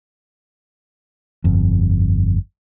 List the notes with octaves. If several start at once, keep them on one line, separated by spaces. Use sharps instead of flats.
G1 F2